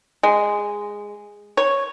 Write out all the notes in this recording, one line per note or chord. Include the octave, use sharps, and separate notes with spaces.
G#3
C#5